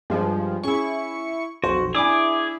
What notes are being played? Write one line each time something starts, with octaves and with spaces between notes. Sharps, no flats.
G2 F3 G#3
C#4 E4 G#4 C#6
B1 F2 F#4 C5
D4 E4 G#4 G#5 D6